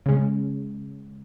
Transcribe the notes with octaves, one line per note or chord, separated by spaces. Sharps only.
C#3 G#3 C#4